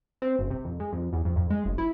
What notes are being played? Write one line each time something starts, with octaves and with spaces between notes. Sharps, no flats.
C4
F#1
C3
F2
G#3
F2
E2
F2
F2
G#3
F#1
E4